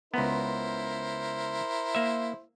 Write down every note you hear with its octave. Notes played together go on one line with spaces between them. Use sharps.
C#2 B3 E4 A#4 C5
A#3 E5